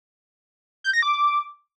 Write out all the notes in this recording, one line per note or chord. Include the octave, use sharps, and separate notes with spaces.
G6
A#6
D6